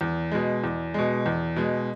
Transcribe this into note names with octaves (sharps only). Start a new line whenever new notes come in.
E2
B2 G#3
E2
B2 G#3
E2
B2 G#3